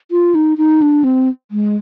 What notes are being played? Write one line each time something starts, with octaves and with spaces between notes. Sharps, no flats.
F4
D#4
D#4
D4
C4
G#3